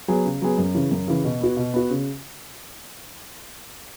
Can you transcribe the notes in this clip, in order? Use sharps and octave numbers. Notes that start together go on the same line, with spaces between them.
F#3 B3 G#4
C#3
F#3 B3 G#4
F#2
C#3 E3
F#2
C#3 E3
B2
B3 F#4
B2
B3 F#4
C#3